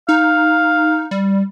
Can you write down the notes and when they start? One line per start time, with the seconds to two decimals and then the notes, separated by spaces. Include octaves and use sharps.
0.09 D#4 F5
1.11 G3